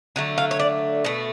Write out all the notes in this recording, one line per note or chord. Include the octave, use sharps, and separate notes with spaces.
D3 F#3 A3
F5
C#5
D5
B2 A3